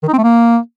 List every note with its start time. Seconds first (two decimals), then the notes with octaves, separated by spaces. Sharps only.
0.03 D#3
0.08 D#4
0.13 C4
0.18 A3
0.23 A#3